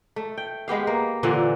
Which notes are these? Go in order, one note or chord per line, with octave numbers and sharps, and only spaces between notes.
A3
G5
G#3 B3 G4 F5
A#3
A#2 D3 E3 F3